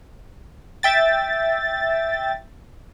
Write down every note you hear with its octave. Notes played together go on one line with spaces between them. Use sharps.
E5 G5 A6